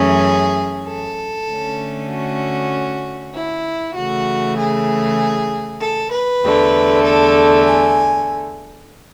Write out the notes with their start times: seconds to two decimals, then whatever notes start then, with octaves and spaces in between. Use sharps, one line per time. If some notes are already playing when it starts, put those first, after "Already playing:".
Already playing: F#2 E3 A3 C#4 G#4
0.88 A4
1.49 D3 A3 C#4
2.11 F#4
3.34 E4
3.96 C#3 E3 A3 F#4
4.58 G#4
5.81 A4
6.12 B4
6.43 E2 D3 A3
7.05 A4
7.66 G#5